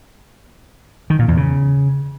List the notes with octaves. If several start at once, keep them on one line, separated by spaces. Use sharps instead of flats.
D#3
A#2
E2
C#3